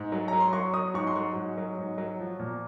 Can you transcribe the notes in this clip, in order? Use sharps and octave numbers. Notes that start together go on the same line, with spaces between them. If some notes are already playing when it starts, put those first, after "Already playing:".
Already playing: G#2
F#3
F#3 A#5
C6
F#3 C#6
F#3 D#6
G#2 C#6
C6
F#3 C#6
G#2
F#3
G#2
F#3
F3
A#2